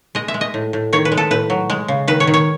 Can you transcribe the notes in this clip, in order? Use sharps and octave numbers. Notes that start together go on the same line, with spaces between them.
G#3 D#5
E5
G#3
D#5
A2
A2
D#3 C#5
B4
G#3
A4
A2 B4
F#3
G#3
C#3
D#3 B4
C#5
D#3
C#5